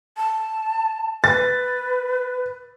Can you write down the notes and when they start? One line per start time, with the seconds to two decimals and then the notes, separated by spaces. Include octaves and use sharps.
0.17 A5
1.24 B4 A6